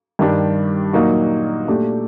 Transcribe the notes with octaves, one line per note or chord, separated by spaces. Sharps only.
G2 D#3 G3 D4 G4
A#2 F#3 A#3 D#4 F#4
A#2 A3 D4 G4